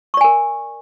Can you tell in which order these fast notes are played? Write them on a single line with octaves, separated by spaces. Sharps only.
C#6 D5 G#5 A#4